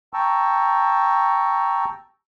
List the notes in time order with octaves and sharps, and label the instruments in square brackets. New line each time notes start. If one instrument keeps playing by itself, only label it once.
[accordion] G5 A5 A#5 C#6 E6